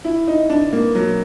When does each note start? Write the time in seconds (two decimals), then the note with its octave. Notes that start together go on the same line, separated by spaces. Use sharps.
0.04 E4
0.27 D#4
0.50 D4
0.73 A#3
0.95 F#3